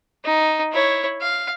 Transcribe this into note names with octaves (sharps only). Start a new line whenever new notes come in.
D#4
E4 C#5
F5